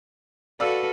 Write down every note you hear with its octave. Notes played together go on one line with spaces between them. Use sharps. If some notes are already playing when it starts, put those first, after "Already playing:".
F#4 A4 B4 D5 F5 E6